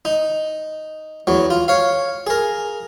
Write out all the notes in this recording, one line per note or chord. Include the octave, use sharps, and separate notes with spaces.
D#4
E2 F#3
F4
C#5 F5
G#4 A#4